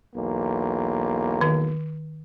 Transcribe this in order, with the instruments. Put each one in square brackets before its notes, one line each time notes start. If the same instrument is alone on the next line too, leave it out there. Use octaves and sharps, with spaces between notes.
[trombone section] B1 E2 A#3
[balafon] D#3